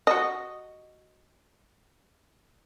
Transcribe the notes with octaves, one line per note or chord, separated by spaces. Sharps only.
F#4 D#5